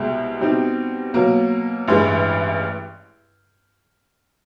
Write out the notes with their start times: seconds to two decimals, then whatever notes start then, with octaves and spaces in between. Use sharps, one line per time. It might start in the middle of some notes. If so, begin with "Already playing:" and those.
Already playing: C2 B2 G#3
0.41 B2 G3 C4 D#4 G4
1.14 B2 F#3 A#3
1.88 A1 G2 E3 G#3